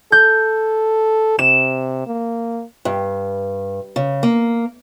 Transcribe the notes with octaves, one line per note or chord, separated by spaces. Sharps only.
A4 G6
C3 E7
A#3
G2
C#3
A#3